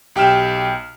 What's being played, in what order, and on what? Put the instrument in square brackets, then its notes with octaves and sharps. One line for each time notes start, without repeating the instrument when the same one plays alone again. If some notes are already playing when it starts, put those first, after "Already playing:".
[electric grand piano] B1 G4 G5 F6 E7